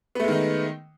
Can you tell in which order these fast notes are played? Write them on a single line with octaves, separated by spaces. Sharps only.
B3 A3 G#3 D#3 D#4